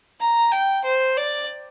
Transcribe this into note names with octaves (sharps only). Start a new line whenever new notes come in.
A#5
G5
C5
D5